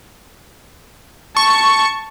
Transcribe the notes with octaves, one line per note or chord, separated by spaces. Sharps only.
A5 C#6